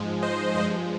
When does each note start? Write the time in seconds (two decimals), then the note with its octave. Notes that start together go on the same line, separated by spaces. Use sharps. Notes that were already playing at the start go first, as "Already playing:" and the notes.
Already playing: G#2 F3 G#3
0.22 C5 D#5
0.55 G2 F3 G#3 C5 D#5